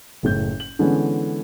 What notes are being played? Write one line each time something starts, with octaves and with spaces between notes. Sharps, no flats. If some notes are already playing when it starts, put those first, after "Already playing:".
F#1 A2 G6
F#7
D3 E3 G#3 B3 C#4